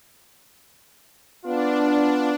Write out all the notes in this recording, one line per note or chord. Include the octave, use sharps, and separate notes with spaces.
B3 D4 F4